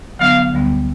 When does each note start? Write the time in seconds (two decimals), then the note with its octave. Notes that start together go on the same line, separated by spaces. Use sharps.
0.19 D3 F#3 B3 D4 F5
0.52 D2 D3 G3 B3